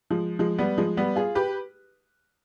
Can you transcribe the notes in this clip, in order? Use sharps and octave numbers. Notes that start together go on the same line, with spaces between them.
F3 G#3
F3 G#3
G3 B3
F3 G#3
G3 B3
F4 G#4
G4 B4